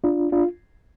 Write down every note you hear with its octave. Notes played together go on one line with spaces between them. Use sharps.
D4 F4
D4 F4